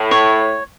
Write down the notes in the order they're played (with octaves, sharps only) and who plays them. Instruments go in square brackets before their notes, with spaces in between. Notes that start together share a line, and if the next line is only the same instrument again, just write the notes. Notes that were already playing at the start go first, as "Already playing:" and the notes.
Already playing: [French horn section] A2
[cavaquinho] C#5